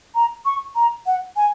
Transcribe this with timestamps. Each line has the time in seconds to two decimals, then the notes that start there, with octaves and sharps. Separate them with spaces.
0.15 A#5
0.45 C#6
0.75 A#5
1.06 F#5
1.36 G#5